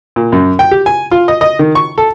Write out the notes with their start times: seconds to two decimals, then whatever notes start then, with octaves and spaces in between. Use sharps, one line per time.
0.16 A#2
0.32 F#2
0.59 G5
0.71 G4
0.86 G#5
1.11 F4
1.28 D#5
1.41 D#5
1.59 D#3
1.75 C#6
1.98 A4